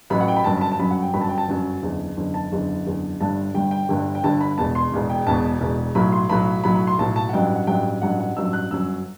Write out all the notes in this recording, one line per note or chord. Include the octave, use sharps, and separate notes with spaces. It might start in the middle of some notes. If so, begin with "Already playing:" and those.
A1 A2 F#3 B5
F#5
G5
B5
G1 F#2 F#3 A5
B5
A5
A5
G1 F#2 F#3 B5
F#5
G5
G1 F#2 F#3 B5
A5
G5
A5
G1 F#2 F#3
F#1 E2 D3
F#1 E2 D3
A5
F#1 E2 D3
F#1 E2 D3
G1 G2 D3 A5
G1 G2 D3 G5
G5
G1 G2 D3
G5
G1 G2 D3 A5
B5
E1 E2 B2 A5
C6
E1 E2 B2
G5
E1 E2 B2 A5
E1 E2 B2
B1 A2 F#3 B5
C6
B1 A2 F#3 B5
B1 A2 F#3 B5
B5
C6
B1 A2 F#3 A5
A5
F#5
A1 G2 F#3 G5
F#5
A1 G2 F#3 G5
A1 G2 F#3 F#5
F#5
A1 G2 F#3 E6
F#6
G1 F#2 F#3 E6